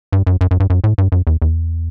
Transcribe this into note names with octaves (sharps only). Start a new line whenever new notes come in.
G2
F#2
F#2
F#2
G2
F#2
A2
G2
F#2
E2
E2